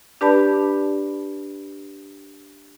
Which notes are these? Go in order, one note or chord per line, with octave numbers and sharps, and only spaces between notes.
D4 G4 B4 D5 A5 B5